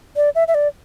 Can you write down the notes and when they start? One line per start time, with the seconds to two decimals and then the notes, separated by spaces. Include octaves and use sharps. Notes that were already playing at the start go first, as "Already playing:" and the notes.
0.16 D5
0.35 E5
0.48 E5
0.55 D5